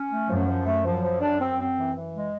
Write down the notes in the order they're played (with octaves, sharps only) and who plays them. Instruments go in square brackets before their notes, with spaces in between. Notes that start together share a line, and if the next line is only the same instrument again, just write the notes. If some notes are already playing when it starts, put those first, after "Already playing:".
Already playing: [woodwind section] C#4
A3
[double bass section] F#2 [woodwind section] F3
[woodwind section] F3
A3
[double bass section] F#2 [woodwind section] F3
[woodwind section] F3
D4
C4
C4
E3
E3
G#3